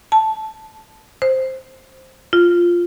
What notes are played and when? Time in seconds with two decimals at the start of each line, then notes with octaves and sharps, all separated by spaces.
0.12 A5
1.22 C5
2.33 F4